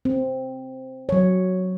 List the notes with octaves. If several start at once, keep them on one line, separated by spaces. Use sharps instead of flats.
C4
F#3 C#5